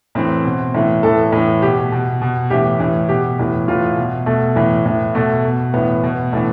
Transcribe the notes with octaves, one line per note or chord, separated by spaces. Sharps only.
A2 E3 C4
B2 C4
A2 E3
A2 E3 A4
A2 E3
B2 G4
B2
B2
A2 E3 G4
A2 E3
B2 G4
A2 E3
A2 E3 F4
B2
B2 A3
A2 E3
A2 E3
B2 A3
B2
A2 E3 B3
B2
A2 E3 A3